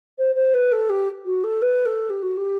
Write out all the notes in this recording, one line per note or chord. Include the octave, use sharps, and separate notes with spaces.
C5
C5
B4
A4
G4
F#4
A4
B4
A4
G4
F#4
G4